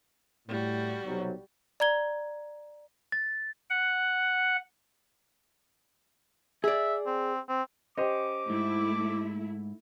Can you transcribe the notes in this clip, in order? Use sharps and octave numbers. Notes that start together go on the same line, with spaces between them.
A2 G3 F#4
B1 C3 F#3
D5 A#5 G#6 G7
A6
F#5
G#4 D5 E5
C4
C4
C#4 G4 C5 D#5 D6
G#2 A3 E4